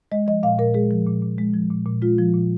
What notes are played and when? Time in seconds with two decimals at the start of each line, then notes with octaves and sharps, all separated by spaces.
0.12 G#3 D#5
0.27 F3 D#5
0.43 A#2 F5
0.58 A#2 A#4
0.74 G#3 G#4
0.91 F3
1.07 A#2
1.22 A#2
1.38 G#3
1.54 F3
1.70 A#2
1.86 A#2
2.02 G#3 F4
2.18 F3
2.34 A#2